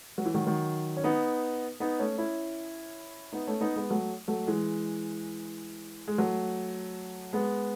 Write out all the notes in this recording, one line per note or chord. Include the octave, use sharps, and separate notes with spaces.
F#3
E3
D#3 F#3
D#3 F#3
C#4
B3 D#4
B3 D#4
A3 C#4
C#4 E4
B3 D#4
A3 C#4
B3 D#4
G#3 B3
F#3 A3
F#3 A3
E3 G#3
G#3
F#3 A3
G#3 B3